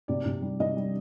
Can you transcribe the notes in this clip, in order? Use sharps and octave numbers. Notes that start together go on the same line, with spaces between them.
C3 D5
C3
G3
C3 D#5
G3